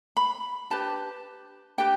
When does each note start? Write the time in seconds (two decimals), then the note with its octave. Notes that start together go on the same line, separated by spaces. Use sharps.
0.17 B5
0.70 D4 G4 B4 A5
1.78 D4 G4 B4 G5